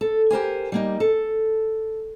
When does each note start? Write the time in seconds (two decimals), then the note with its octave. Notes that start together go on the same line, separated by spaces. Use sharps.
0.01 A4
0.30 G4 A#4 C5 G#5
0.72 G3 A#3 D#4
1.00 A4